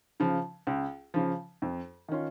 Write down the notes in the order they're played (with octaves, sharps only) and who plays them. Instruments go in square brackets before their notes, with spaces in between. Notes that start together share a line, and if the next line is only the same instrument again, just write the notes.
[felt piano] C#3 F3
C#2
C#3 F3
F2
D#3 C#4 F4